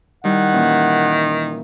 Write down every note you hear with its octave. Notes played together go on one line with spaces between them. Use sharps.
D#3 G3 E4 F#5
A#2 E3 C#4